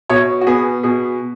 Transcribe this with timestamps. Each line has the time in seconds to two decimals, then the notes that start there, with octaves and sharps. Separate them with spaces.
0.09 B2 C#5
0.41 F#4
0.47 B3 G#4
0.83 B2 G#4